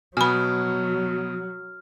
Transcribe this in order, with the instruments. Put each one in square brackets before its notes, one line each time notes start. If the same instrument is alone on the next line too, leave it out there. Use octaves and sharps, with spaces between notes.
[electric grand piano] B2 B3 [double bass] F#3 [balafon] G#5 B5 [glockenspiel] F6